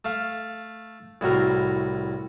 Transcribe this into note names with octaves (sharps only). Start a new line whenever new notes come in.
A3 F5
C2 A2 F#4 A#4